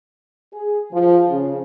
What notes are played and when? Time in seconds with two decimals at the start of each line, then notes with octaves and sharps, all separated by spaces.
0.53 G#4
0.93 F3
1.30 C#3